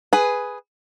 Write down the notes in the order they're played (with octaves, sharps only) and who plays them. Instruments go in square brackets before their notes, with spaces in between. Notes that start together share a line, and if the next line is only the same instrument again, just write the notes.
[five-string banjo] G#4 B4